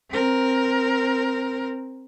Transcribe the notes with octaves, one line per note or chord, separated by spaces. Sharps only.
C4 A#4